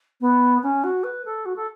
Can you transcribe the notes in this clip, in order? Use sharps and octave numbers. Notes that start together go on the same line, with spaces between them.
B3
C#4
F#4
B4
A4
F#4
A4